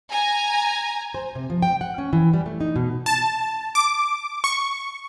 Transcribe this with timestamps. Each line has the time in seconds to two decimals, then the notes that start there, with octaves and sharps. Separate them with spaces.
0.12 G#5 A#5
1.14 C5
1.35 C3
1.50 F3
1.62 G5
1.81 F#5
1.98 C#4
2.13 E3
2.34 G3
2.46 A3
2.61 D#4
2.76 B2
3.06 A5
3.75 D6
4.44 C#6